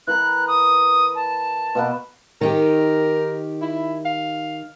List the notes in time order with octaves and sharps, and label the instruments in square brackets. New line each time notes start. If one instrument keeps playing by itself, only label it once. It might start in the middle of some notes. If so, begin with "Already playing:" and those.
[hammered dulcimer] E3 A#4 B5 [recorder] F#6
[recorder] D#6
A5
[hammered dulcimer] B2 A#3 B4
[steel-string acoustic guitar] D#3 D#4 G4 [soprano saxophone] A#4
[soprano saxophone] E4
F5